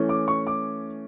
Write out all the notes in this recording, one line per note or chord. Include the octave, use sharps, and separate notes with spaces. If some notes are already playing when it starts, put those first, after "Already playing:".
Already playing: E3 A3 C#4
D6
C#6
D6